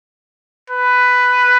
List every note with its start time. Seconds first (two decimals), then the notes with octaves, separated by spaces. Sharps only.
0.70 B4